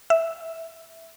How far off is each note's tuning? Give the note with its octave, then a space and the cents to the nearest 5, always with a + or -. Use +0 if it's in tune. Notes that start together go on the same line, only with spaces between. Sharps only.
E5 -5